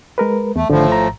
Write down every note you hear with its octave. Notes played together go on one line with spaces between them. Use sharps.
G#3 A#4 B4
E2 A3
G#1 A2 D3 F3
A#5